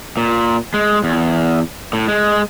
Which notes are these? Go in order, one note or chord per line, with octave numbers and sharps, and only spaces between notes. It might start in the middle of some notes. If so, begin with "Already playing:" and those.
A#2
G#3
E2
A2
G#3